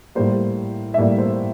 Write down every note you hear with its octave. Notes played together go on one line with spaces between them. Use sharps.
A2 G3 A#3 C5
E5
A2 G3 A#3 D5
C5